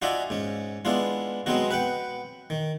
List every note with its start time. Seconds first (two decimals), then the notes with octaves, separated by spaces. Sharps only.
0.02 D#4 F4 F#4 D5 E5 G#5
0.30 G#2 C#4
0.85 G#3 B3 D4 E4 F4
1.46 F#3 G#3 B3 C4 D#4 F#4
1.71 B4 F#5 G5
2.50 D#3